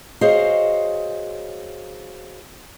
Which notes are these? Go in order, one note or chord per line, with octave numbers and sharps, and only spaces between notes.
F#4 G#4 C5 C#5 D#5 F5